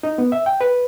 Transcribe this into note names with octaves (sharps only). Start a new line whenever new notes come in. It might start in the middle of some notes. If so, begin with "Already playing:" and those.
D#4
B3
E5
G5
B4